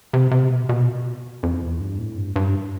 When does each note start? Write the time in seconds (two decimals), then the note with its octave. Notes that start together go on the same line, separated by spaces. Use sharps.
0.13 C3
0.31 C3
0.49 B2
0.69 B2
1.43 F2
1.62 E2
1.80 G2
1.99 A2
2.17 G2
2.36 G2